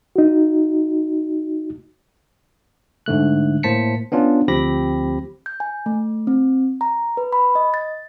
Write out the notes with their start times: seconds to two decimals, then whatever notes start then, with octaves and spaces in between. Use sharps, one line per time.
0.16 D#4 F#4
3.06 G#2 D3 A3 F#6
3.63 A2 A#3 C5 A5 B6 C#7
4.12 B3 C#4 D4 F4
4.48 D2 F3 C4 G4 B5 A#6
5.46 G6
5.60 G#5
5.86 A3
6.27 C4
6.81 A#5
7.17 B4
7.33 B5
7.55 D#5
7.74 A6